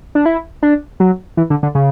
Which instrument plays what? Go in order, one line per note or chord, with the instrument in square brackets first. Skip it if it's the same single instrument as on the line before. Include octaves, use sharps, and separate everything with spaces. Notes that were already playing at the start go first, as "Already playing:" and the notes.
[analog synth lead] D4
E4
D4
F#3
E3
D3
D3
C#3